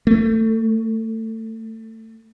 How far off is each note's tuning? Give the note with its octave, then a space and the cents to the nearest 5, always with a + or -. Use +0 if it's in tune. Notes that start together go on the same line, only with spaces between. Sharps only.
A3 +25